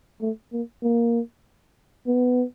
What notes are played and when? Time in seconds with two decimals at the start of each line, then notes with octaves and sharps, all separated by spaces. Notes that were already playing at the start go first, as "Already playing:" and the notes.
0.21 A3
0.52 A#3
0.83 A#3
2.07 B3